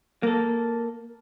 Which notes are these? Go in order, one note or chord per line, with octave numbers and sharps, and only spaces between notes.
A#3 A4